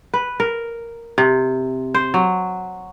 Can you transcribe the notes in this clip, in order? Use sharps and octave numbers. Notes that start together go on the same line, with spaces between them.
B4
A#4
C3
C5
F#3